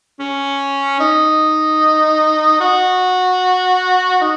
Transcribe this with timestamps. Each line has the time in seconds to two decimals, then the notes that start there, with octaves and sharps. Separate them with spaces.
0.19 C#4
1.00 D#4
2.60 F#4
4.21 D#4